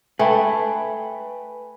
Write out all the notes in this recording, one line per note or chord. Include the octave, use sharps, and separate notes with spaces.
A3 B4 G5 G#5 B5